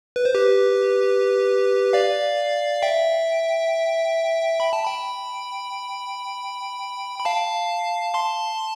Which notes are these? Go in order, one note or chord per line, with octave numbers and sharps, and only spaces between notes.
B4
C5
G4 B4
D5 F5
E5 G5
B5
A5
G5 B5
B5
F5 A5
A5 C6